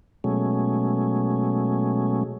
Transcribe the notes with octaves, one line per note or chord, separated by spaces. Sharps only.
B2 F#3 G#3 A3 C#4